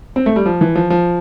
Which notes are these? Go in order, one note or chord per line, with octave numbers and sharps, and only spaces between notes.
C4
A3
G3
F3
E3
F3
F3